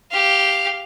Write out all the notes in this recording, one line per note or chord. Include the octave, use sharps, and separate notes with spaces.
G4 F5